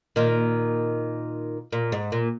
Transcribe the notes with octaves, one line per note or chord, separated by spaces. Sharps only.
A#2 D#3
A#2
G#2
A#2